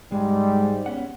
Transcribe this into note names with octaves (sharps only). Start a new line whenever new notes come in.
G#2 G3 G#3
B3 C#4 F#5